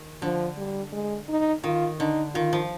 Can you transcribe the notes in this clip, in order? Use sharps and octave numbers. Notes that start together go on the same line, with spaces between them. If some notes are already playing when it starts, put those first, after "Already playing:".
Already playing: D#3
D3 F3
G3
G#3
D#4
D#3 F4
D3 D#4
D#3 F4
F3